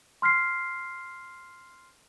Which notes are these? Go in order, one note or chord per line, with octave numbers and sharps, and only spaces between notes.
C6 F6 B6 C7